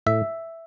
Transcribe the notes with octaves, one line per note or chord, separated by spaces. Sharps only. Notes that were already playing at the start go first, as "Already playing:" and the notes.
A2 E5